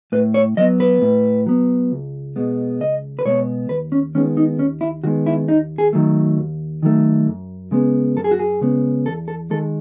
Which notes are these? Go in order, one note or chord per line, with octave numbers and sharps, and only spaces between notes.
A2 B4
C#5
F#3 B3 D#5
B4
A2
F#3 B3
C#2
B2 G#3 B3
C#2 D#5
B4
B2 G#3 B3 C#5
D#2 B4
C#4
D#3 G#3 B3 C#4
D#4
D#2 C#4
E4
D#3 G#3 B3 F#4
E4
D#2 D#4
G#4
D#3 F#3 A3
D#2
D#3 F#3 A3
F#2
C#3 G#3 B3
F#2 A4
G#4
F#4
G#4
C#3 G#3 B3
E2 A4
A4
D#3 G#3 A4